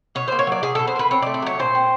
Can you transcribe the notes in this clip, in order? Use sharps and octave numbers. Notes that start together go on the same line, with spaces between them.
B2 C#5
A#3 C5
C#5
F#3 D5
B2 G#4
B2 A4
C5
A#3 B4
C4 C#5
D5
A3
D5
F#3 C#5
A#2 C5
C4